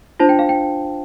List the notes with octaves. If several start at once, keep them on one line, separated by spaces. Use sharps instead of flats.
D4 F4 C5 A5
G5
F5
G5